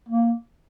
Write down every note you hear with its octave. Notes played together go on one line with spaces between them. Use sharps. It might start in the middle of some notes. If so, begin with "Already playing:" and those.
A#3